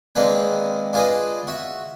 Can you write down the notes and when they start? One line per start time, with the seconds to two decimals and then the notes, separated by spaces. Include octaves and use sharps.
0.15 D#3 G#3 A#3 C4 D4 B4
0.93 D4 F4 G#4 B4 D#5
1.47 F#4 E5